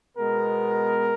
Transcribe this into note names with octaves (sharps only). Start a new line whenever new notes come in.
B2 G#3 B3 A#4